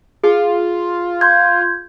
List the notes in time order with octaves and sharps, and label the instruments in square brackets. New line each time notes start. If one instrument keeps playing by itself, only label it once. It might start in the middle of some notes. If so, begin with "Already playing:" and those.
[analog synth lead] F4 [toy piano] G#4
[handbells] C6 G6 G#6